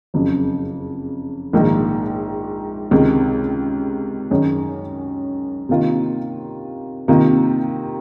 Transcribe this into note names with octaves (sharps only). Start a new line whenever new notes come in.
F#1 F2 C#3 F#3 C4
A#1 G#2 D#3 A#3
C#2 C3 D#3 G#3
F#2 D#3 G#3 C#4
C3 D#3 A#3 F4
C3 D#3 A#3 F4